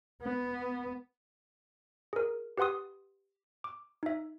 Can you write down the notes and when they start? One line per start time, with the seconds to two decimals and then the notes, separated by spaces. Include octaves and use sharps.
0.22 B3
2.13 G#4 A#4
2.58 G4 B4 F#5 C6 D#6
3.64 D6
4.03 D#4 E5